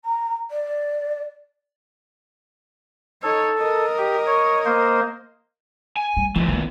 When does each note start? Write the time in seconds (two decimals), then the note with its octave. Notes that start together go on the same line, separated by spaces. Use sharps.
0.04 A#5
0.50 D5
3.23 D#4 A4 C#5
3.58 A#4 D#5
3.98 G4
4.27 C#5
4.66 A#3 C5
5.97 G#5
6.17 G3
6.36 A#2 C#3 E3 F3
6.48 D#3 B3